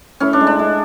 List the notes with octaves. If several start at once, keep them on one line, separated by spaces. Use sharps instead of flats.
A2 C#4
D4
G#3
D4
G#3